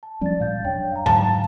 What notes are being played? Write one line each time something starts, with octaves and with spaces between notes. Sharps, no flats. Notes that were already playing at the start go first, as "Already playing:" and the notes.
A5
F3 G3 C#4 D5 A6
A#2 G3 F5 G6 A6
F#2 D4 C#5 G5
F5 A#5
G#2 D3 F#3 A5